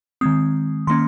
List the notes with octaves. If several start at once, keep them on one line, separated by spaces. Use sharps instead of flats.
D#3 G#3 C4 D#6
D#3 A#3 C#4 C6